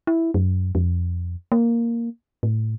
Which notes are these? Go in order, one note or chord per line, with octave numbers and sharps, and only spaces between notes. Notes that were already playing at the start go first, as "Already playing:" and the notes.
E4
F#2
F2
A#3
A2